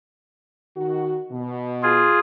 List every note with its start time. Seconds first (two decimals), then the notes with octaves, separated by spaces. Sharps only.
0.76 D#3 F#4
1.31 B2
1.83 F4 G#4